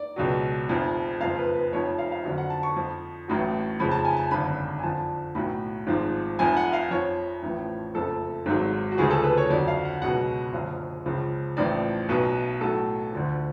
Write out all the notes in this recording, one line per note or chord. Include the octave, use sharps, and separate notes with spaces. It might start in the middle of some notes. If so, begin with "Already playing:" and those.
Already playing: D5
C#2 B2 F#3
F1 F2 F3
F#1 F2 F3 F5
B4
B4
F1 F2 F3 C#5
F5
F5
F2 D3 F#3 F5
F#5
A5
C#6
F2 F3
A1 A2 F#3
F2 C#3 F3 B5
A5
G#5
A5
G#1 F#2 D3 B5
G#5
F2 D3 F3 A5
B1 A2 F#3 B5
G#1 G#2 F3
F1 F2 F3 G#5
F#5
F5
F2 F3 C#5
A1 A2 F3
F#1 F2 F3 A4
G#1 G#2 F#3
F#4
D2 C#3 F3 G#4
A4
B4
C#5
F2 D3 F#3 D5
F5
F#5
C#2 B2 F#3 F#5
F#1 F#2 D3 F3 F5
C#2 C#3 F3
A1 A2 F3 D5
B1 B2 F#3 B4
B1 A2 F#3 A4
D2 D3 F3